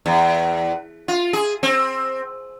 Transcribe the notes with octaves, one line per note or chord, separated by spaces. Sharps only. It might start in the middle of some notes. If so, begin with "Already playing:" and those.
E2
F4
G#4
C4